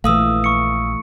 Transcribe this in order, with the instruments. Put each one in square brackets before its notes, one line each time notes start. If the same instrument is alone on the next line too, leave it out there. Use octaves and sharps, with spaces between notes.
[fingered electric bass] A#1 [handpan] E3 A3 [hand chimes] F5 D#6 E6
[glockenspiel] C#6 C#7